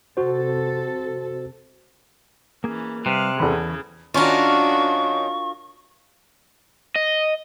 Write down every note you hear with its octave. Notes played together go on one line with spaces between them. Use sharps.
C3 F#4 A4 C5
E3 A#3 C#4 G#4
C3 G3 B4 F5 F#6
E2 C#3 E3 A4 B5
D#3 C#4 D4 F4 F#4 A#4 C#6
D#5